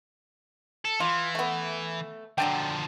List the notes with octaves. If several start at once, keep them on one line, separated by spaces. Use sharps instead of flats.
A4
E3 F4
A3 B3
D3 F3 F#3 D4 G5